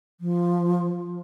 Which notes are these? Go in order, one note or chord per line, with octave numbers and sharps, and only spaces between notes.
F3